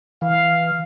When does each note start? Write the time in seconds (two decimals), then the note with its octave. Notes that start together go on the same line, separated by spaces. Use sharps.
0.22 E3 F5